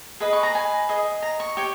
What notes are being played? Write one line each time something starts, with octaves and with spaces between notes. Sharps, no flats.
G#4 B4 D#5 B5
C#6
A#5
G#5
G#4 D#5
A#5
C#6
G4 C#5